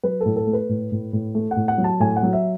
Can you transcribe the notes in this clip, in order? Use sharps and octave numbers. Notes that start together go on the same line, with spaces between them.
F#3 B4
A2 A4
A4
A3
B4
A2
A2
A2
A3
F#5
A2
F#5
F#3
A5
A2 G#5
F#5
F#3
E5